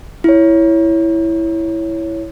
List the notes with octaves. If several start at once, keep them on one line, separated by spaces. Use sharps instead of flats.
E4 C#5